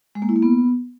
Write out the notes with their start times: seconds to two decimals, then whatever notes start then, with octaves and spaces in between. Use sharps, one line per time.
0.15 G#3
0.22 A#3
0.29 E4
0.36 A#3
0.42 B3